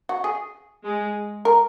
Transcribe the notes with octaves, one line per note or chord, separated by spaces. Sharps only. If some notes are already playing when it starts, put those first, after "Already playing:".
F#4
G#4
G#3
A#4